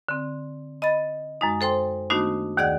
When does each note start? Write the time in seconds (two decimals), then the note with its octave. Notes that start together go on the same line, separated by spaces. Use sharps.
0.09 D3 C4
0.82 D#5 B5 A6
1.41 F#2 G#3 D#4
1.61 A4 C5 G5 C6
2.10 D#3 A3 B3 D4 D#4 F#4
2.57 D#2 D#3 G#4 D5 F#5 F#6